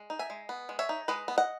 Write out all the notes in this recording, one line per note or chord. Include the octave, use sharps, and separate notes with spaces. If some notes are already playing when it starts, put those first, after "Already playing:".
Already playing: G#3
D#4
E5 G#5
G#3
B3
G#3
C#5 E5
D#4
G#3 B4 D#5
B3
D#5 F#5